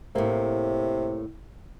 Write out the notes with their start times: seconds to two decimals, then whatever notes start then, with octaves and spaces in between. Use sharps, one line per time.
0.15 A2 C3 A#3